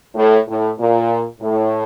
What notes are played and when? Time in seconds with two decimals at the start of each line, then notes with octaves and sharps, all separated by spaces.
0.15 A2
0.47 A2
0.78 A#2
1.41 A2